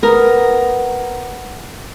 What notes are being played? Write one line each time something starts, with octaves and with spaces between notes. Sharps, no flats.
B3 A#4